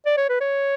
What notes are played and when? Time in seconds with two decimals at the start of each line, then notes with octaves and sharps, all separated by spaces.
0.06 D5
0.17 C#5
0.29 B4
0.40 C#5